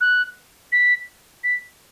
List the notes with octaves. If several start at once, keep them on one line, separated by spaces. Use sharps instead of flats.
F#6
B6
B6